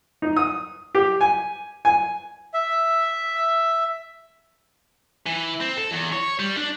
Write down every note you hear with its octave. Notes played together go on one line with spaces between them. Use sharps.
D#4
D#6
G4
G#5
G#5
E5
E3
C4
A4
E2
C#5
G3
D4